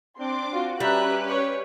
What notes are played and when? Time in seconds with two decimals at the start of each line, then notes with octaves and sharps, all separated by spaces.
0.19 C4 D4 C6 D6
0.52 F4 F#4
0.80 G3 C#4 G4 B4 E5 A#5 F#6
1.28 C#5